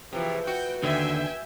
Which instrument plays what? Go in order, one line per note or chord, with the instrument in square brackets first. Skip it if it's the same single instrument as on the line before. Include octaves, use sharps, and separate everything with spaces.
[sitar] C3 E3 [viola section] F3 G#4 [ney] B4
[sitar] F#4 [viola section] G5
[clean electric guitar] D#2 D3 [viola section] E5 G5 G#5